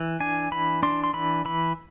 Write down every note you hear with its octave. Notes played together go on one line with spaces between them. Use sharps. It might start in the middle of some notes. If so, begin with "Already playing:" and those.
Already playing: E3
D4 G#5
E3 B5
D4 C6
C6
E3 B5
E3 B5